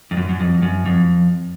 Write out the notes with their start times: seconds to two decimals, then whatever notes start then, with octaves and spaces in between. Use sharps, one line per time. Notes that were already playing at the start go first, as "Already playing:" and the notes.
0.11 F2
0.17 F#2
0.29 F#2
0.40 F2
0.62 F#2
0.86 F2